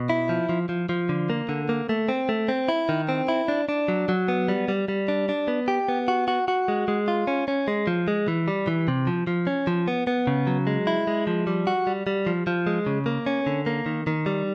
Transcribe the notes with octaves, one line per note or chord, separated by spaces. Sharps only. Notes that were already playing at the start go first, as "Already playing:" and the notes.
Already playing: B2
E4
F3
F3
F3
F3
D3
A#3
D3
A#3
A3
C4
A3
C4
E4
D#3
C4
E4
D4
D4
F#3
F#3
B3
G3
G3
G3
D4
D4
B3
G4
B3
F#4
F#4
F#4
G#3
G#3
F4
C#4
C#4
G#3
F3
G#3
E3
G3
E3
C3
F3
F3
C#4
F3
B3
B3
C#3
F#3
G#3
E4
G#3
F3
G3
F#4
G3
G3
F3
F3
G#3
C#3
A#3
C#4
D3
A#3
D#3
D#3
G3